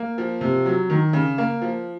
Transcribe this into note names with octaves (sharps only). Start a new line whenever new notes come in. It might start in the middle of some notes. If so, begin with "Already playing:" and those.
Already playing: A#3
F3
C3
F#3
D#3
C#3
A#3
F3